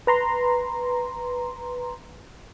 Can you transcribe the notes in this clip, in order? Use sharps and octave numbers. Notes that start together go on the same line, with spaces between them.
B4 A#5 C6